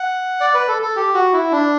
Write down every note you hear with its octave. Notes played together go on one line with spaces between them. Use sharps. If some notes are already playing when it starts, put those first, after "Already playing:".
Already playing: F#5
D5
B4
A4
A4
G4
F#4
E4
D4